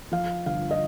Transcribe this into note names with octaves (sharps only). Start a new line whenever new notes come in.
F3 F5
G1 F5
D#5